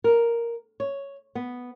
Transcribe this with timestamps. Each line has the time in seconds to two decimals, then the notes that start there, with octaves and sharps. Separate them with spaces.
0.04 A#4
0.80 C#5
1.35 B3